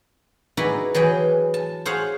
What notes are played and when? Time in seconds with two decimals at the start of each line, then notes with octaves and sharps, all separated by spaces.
0.57 D#4 E4 F#4 G#4 B4 D5
0.94 E3 F#3 G#4 G5
1.54 A5
1.85 G#4 C5 C#5 F5 F#5